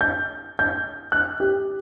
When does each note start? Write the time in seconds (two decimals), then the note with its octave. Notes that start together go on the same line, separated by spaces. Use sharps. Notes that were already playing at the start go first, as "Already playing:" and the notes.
0.01 G6
0.59 G6
1.12 F#6
1.40 G4